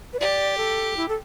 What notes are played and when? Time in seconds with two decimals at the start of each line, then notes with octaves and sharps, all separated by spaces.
0.13 B4
0.19 G4 D5
0.58 A4
0.97 E4
1.09 A4